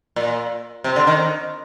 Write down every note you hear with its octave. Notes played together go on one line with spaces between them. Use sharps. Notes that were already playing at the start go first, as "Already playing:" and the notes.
A#2
C3
D3
D#3